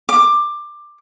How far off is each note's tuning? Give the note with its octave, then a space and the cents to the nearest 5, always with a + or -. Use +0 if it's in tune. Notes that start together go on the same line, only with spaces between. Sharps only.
D6 +15